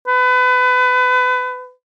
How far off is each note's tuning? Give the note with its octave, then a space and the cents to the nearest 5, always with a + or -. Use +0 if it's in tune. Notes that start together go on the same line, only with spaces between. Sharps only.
B4 +30